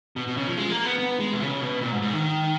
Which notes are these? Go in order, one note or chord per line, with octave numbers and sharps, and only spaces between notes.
B2
B2
C#3
F3
G#3
A#3
B3
B3
G#3
B2
C#3
B2
A#2
G#2
G#2
D#3